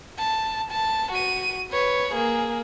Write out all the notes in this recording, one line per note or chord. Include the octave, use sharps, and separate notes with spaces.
A5
A5
F#4 D#7
B4 C#5
A#3 G#4